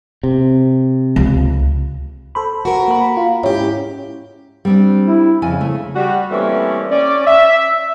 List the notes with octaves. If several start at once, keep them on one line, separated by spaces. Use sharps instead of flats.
C3
C#2
A4 C5 B5
F#4 A#4
A#3 B5
F4
G#2 C#4 E4 G4
G3 C4 D4
E4
F2 C#3 G#5
A3
G3 F#4
E3 G3 A3 A#3 C4 C#4
C#4 D5
E5